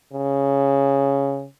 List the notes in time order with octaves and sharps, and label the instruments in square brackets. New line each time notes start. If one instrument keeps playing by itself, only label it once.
[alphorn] C#3